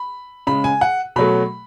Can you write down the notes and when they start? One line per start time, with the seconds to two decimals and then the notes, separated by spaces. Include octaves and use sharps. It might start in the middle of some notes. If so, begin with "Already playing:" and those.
Already playing: B5
0.47 C#3 G#3 B5
0.64 G#5
0.81 F#5
1.16 B2 F#3 A3 B5